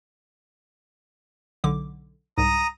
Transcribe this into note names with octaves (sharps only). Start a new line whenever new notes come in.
B1 D3 D6
C2 G#2 A#5 D#6